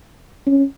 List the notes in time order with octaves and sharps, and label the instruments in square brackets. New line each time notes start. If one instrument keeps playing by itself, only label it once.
[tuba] C#4